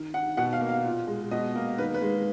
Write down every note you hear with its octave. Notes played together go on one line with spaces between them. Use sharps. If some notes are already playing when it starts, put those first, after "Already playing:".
Already playing: D#3
D#3 F#5
B2 F#5
F5
A#3
F5
A#2
G#3
B2 D#5
A#3
D#3 B4
B4
G#3